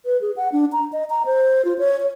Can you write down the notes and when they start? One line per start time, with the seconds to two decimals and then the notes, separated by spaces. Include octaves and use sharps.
0.06 B4
0.21 G#4
0.37 F#5
0.52 D4
0.72 A#5
0.93 D#5
1.10 A#5
1.26 C5
1.65 F4
1.79 C#5
2.00 C#5